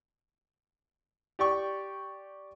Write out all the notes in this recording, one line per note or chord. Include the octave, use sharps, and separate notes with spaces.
G4 D5 G5 C#6